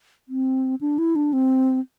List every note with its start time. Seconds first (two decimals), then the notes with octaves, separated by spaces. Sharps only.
0.28 C4
0.81 D4
0.98 E4
1.16 D4
1.33 C4